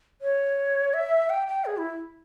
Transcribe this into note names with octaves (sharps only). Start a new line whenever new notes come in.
C#5
E5
G5
G5
G#4
E4